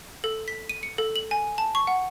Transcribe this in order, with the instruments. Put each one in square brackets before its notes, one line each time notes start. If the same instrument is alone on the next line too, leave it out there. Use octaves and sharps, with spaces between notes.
[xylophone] A4
B6
D#7
C#7
A4
F#7
G#5
A5
C#6
F#5